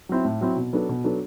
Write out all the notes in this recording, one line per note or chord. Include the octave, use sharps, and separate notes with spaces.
F#3 C4 E4
A2
F#3 C4 E4
B2
F#3 B3 D4 A4
B2
F#3 B3 D4 A4